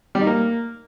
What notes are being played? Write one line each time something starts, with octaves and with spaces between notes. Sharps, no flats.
G3
D#4
A#3